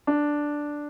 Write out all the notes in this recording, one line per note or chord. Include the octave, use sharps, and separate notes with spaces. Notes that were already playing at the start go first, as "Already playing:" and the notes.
D4